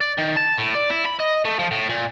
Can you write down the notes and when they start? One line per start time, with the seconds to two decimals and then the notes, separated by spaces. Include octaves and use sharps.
0.01 D5
0.18 D#3
0.37 A5
0.58 A2
0.75 D5
0.90 E4
1.06 B5
1.20 D#5
1.45 A3
1.59 F3
1.71 A2
1.89 A#2